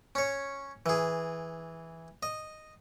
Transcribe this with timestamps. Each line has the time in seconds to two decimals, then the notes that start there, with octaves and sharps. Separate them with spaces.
0.15 C#4 C#5
0.86 E3 G#4
2.23 D#5